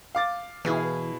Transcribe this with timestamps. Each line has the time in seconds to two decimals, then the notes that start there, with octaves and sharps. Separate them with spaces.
0.15 F5 D6 A6
0.65 B2 E3 E4 G#4 F5